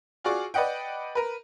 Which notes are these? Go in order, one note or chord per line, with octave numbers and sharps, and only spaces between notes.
F4 F#4 G#4 D5 C#6 D6
B4 D5 D#5 F#5 G5
A#4 B4